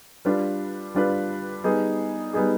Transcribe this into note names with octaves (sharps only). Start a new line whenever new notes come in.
G3 D4 F4 B4
G3 D4 F4 B4
G3 B3 D#4 G#4
G3 B3 D#4 G#4